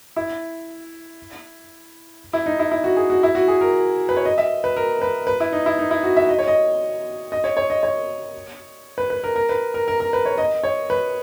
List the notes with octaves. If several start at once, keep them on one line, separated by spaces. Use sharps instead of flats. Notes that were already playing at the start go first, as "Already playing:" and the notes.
E4
E4
D#4
E4
E4
F#4
G#4
F#4
E4
F#4
G#4
A#4
B4
C#5
D#5
E5
B4
A#4
B4
B4
E4
D#4
E4
D#4
E4
F#4
E5
D#5
C#5
D#5
D#5
C#5
C#5
D#5
C#5
B4
B4
A#4
A#4
B4
A#4
A#4
A#4
B4
C#5
D#5
C#5
B4